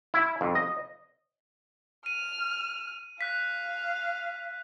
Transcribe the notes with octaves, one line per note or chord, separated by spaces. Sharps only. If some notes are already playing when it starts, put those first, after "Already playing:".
E4
F2
D#5
F6 D#7
F5 F#6 B6